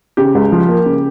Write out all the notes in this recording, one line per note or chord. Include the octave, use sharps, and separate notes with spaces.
C#3 G4
C#2
F3
A#3
C#3